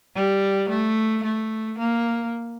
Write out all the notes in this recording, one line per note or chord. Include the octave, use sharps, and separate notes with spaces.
G3
A3
A3
A#3